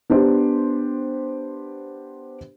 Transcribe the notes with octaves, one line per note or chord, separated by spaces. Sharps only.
B3 D4 G4 C5